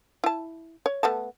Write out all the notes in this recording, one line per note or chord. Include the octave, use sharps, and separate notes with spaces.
E4 A5
C#5
A3 B3 A5